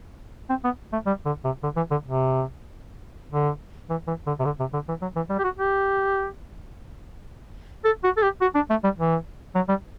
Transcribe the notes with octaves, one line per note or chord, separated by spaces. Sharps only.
C4
B3
A3
G3
D3
C3
D3
E3
D3
C3
D3
E3
E3
D3
C3
D3
C3
D3
E3
F#3
E3
G3
G4
F#4
G4
A4
F#4
A4
G4
F#4
D4
A3
G3
E3
F#3
G3